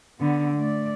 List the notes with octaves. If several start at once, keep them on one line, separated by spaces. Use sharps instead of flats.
D3 B3
A3 D5